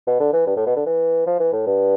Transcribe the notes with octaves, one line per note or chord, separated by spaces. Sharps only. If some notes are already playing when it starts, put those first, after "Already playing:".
B2
D3
E3
G2
A2
B2
D3
E3
F3
E3
A2
G2